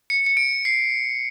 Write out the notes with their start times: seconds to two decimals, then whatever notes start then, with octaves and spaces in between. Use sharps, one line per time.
0.10 C#7
0.26 C#7
0.37 D7
0.65 C7